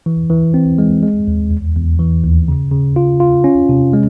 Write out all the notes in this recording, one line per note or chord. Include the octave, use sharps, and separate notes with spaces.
E3
E3
C4
G#3
G#3
D#2
E2
E2
E3
D#2
C#3
C#3
F4
F4
C#4
C3
G#3